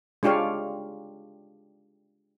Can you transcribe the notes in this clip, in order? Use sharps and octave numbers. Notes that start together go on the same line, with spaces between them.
G#3 D4 F4 G4 C#5 F5